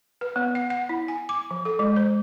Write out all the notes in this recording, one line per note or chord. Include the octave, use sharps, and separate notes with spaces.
B4
B3
F#5
F#5
E4
G#5
D6
F3
A4
G#3
C5